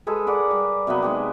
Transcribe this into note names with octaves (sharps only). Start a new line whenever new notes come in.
G#3 G#4 A4 B4
A#4 B4 D5 F#5
G3
C3 F#3 A#3 B3
D#3 G#3 G4